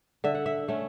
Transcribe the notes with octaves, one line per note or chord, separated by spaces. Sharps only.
D3 E5
F#5
E5
A3 C#4